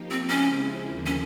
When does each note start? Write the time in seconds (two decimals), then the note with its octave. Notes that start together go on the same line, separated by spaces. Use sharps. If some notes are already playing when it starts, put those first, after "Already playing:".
Already playing: F3 A#3 D#4 G4
0.11 C4
0.29 C#3 F3 G#3 C4 C#4 E4
0.84 D#2 D3 F3 A#3 D4
1.06 C#4